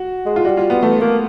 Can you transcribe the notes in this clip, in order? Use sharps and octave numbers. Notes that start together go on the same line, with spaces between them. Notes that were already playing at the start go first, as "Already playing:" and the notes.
Already playing: F#4
G#3
F4
G3 F#4
F4
B3
E3 A3
A3 A#3